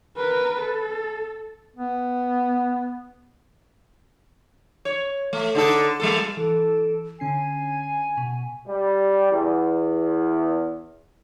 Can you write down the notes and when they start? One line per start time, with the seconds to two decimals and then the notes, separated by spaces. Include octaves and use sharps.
0.17 A#4 B4
0.60 A4
1.76 B3
4.85 C#5
5.33 A3
5.55 D3 D#4 A4
6.00 G3 A#3 A4
6.37 E3 A4 D7 E7
7.20 D3 C#4 G#5 C7
8.17 B2
8.67 G3
9.31 E2